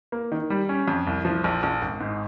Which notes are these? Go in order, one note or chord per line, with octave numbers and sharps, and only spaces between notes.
A#3
D#3
G3
C#4
F2
C2
F3
A#1
A#1
G#1
G#2